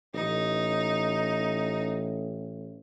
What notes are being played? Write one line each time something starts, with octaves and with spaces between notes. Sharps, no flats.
A1 D#4